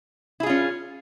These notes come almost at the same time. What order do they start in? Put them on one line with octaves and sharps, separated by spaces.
E4 G#4 F4 C#4